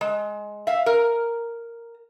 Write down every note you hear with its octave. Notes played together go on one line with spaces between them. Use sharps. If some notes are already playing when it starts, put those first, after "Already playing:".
G#3
E5 F5
A#4